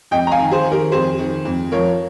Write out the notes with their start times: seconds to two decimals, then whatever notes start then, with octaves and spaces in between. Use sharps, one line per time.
0.11 F2 D#5 G5
0.27 A#5
0.32 F5 G#5
0.38 D#3
0.51 G#4 C5
0.66 D#3
0.71 G4 A#4
0.92 F2 G#4 C5
1.19 D#3
1.45 F2
1.72 F3 A#4 C#5